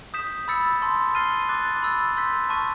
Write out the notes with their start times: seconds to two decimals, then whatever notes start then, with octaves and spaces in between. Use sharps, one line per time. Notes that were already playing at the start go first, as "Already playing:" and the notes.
0.14 D#6 G6 B6 E7
0.48 B5 E6 A6 C#7
0.82 A5 C6 E6 A6
1.15 F6 A6 C7 D#7 G7
1.49 D6 F#6 A6
1.82 B5 E6 A6
2.17 C6 E6 G6 B6
2.49 A5 C#6 F6 A#6 D#7